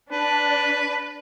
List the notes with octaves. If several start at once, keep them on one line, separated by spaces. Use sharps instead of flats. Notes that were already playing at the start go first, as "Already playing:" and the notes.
D4 B4